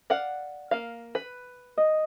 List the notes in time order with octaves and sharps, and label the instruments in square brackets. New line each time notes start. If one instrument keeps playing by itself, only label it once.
[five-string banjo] D5 F5 F#5
A#3 F5
B4
[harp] D#5